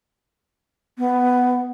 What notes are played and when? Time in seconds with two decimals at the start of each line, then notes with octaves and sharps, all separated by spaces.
0.98 B3